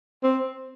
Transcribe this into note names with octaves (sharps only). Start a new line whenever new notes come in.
C4